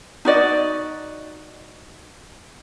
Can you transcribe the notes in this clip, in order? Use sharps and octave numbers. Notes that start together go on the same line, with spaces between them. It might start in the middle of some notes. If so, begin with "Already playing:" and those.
D#4 F#4 D5 D#5